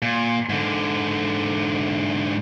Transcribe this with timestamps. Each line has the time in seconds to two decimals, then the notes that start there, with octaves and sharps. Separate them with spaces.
0.02 A#2
0.49 G#2 D3